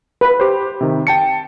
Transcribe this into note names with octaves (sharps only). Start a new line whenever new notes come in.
B4
G4 C5
C3 D#3
G5 A5 C#7